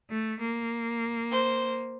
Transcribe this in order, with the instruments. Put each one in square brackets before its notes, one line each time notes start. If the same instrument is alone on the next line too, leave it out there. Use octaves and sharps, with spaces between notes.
[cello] A3
A#3
[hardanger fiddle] C5